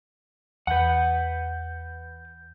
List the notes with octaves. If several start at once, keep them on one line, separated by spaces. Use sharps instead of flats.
E2 B4 F#5 G6